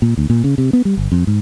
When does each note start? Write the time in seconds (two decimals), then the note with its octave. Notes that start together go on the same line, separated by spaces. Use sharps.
0.02 A#2
0.18 D2
0.30 A#2
0.44 C#3
0.58 C3
0.73 B3
0.85 G3
0.97 G1
1.12 F2
1.27 G#2